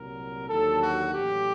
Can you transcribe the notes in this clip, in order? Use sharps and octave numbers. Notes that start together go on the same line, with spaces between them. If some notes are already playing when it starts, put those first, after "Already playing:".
Already playing: C2 A#2 F#3 A#4
D#2 D3 F#3 A4
F#4
A1 A2 F#3 G4